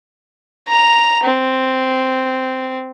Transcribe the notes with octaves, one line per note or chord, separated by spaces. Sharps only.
A#5 F7
C4